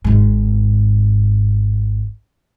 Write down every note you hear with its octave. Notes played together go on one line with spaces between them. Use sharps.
G#1 G#2